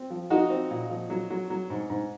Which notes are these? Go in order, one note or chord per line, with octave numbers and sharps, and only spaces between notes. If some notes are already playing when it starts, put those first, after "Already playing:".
Already playing: C4
F3
F3 D#4 F#4
C4
A#2
F3
F#3
F#3
F#3
G#2
G#2